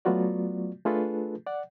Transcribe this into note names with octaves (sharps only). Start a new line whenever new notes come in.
F#3 A3 B3 F4 F#4 D5
A3 D4 F4 G#4 A4 B4
D5 F#5